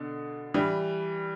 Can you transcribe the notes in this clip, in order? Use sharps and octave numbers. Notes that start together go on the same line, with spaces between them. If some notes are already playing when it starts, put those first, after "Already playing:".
Already playing: B2 D3
E3 G3